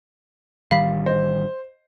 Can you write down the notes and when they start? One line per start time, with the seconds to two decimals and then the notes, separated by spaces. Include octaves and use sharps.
0.71 A1 D#3 G3 F5 B5 B6
1.06 C5 D#5